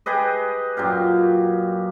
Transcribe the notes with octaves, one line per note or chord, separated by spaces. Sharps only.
G4 G#4 B4 D#5
F#2 A#2 G4 F5